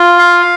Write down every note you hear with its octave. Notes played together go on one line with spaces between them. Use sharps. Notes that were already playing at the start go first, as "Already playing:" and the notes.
Already playing: F4
F5